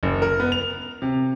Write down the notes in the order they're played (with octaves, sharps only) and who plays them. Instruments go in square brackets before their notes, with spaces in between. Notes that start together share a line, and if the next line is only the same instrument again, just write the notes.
[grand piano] F#1
A#4
B3
F7
C3